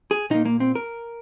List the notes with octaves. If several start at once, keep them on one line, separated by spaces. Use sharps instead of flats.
G#4
A#2 A#3 D#4
A#3
C4
A#4